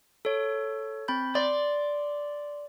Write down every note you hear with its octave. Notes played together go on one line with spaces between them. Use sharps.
A4 C#5
C4 B5 G6
D5 C6